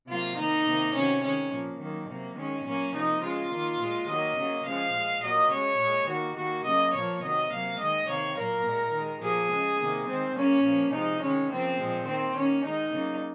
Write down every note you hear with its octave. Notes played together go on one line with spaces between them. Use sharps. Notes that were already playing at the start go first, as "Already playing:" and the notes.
C3 F#3 A#3 F4
D#3 A#3 D#4
C3 D#3 A#3
C3 D#3 F#3 C#4
D#3 G#3 C#4
A#2 F3 A#3
D#3 F#3 A#3
C3 F#3 A#3
D#3 G#3 C#4
A#2 F#3 A#3 C#4
C3 F3 A#3 D#4
C#3 G#3 F4
D#3 A#3
A#2 G#3
D#3 F#3 A#3 D#5
C#3 F#3 A#3
C#3 F3 G#3 F5
A#2 G#3
A#2 F#3 A#3 D#5
C#3 G#3 C#5
A#2 G#3
D#3 A#3 F#4
D#3 A#3 F#4
C#3 F#3 A#3 D#5
A#2 F3 A#3 C#5
C3 D#3 F#3 D#5
C3 F#3 A#3 F5
D#3 G#3 D#5
C3 D#3 A#3 C#5
A#2 F#3 A#3 A#4
A#2 G#3
D#3 G#3
A#2 F3 A#3 G#4
C#3 G#3
C3 D#3 A#3
D#3 G#3 C4
C#3 F#3 A#3 C#4
A#2 F3 A#3
C3 F3 G#3 D#4
D#3 G#3 C#4
C#3 F3 A#3 C4
A#2 F3 G#3
D#3 A#3 C4
D#3 A#3 C#4
D#3 G#3 D#4
C#3 F#3 A#3